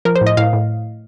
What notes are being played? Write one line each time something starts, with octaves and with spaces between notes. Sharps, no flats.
F3 A#4
C5
A2
D#5
A2 F5
A2